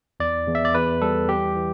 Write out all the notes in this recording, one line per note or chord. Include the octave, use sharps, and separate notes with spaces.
E2 D5
E2
E5
D5
E2 B4
G3 A4
E3 G4
E3